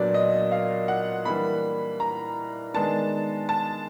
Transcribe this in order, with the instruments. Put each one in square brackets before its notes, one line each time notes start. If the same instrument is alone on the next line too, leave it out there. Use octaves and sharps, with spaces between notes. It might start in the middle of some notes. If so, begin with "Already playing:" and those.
Already playing: [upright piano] A#2 F#3 B3 D4 D5
D#5
F5
F#5
E3 G3 A#3 D4 B5
A#5
D#3 G#3 B3 D4 A5
A5